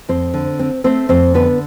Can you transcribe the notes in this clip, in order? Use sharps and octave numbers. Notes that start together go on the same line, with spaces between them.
F2 C4 C5
D3
C4
A3 C4 C5
F2 C4 C5
D3 B3 B4